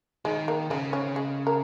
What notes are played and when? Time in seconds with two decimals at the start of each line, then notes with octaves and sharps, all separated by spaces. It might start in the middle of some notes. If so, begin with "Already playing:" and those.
0.25 D#3 G#3
0.48 A#3
0.70 C#3 G#3
0.93 C#4
1.16 G#3
1.47 A#4